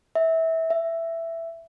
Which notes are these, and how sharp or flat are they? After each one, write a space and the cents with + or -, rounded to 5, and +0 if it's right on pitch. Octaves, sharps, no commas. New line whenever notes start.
E5 -20
E5 +10